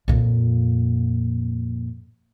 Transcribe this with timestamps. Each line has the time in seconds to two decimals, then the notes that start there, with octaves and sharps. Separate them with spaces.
0.08 F2 A#2